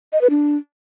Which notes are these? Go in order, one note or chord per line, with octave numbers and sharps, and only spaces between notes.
D#5
B4
D4